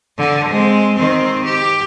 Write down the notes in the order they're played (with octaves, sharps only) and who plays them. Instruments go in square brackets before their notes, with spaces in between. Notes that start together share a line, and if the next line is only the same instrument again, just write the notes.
[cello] D3
G#3 C4
D#3 C4
G4